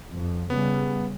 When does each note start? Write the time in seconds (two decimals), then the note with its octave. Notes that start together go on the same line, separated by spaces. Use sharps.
0.15 F2
0.50 C#3 G3 B3